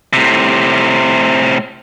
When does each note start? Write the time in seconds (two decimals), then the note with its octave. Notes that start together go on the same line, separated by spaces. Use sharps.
0.13 A2 C3